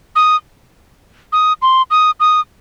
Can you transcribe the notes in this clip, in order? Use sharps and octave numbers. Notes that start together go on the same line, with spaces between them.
D#6
D#6
C6
D#6
D#6